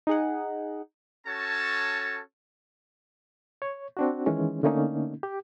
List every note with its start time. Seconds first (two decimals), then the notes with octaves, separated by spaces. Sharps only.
0.07 D#4 G#4 F#5
1.27 C#4 F#4 A4 C#5 A5
3.62 C#5
3.97 C4 D4 F#4
4.26 D#3 E3 G#3 C#4
4.63 D3 A3 A#3 C#4 D#4
5.23 G4